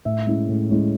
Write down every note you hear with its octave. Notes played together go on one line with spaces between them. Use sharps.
A2 E5
G#3 C#4 E4
A2
G#3 C#4 E4